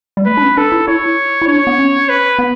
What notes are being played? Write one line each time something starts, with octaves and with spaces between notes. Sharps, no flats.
G3
A3 B4
D4
C#4
D4 A4
E4
E4 C#5
E4
D4 C#5
B3
C#4
B4
B3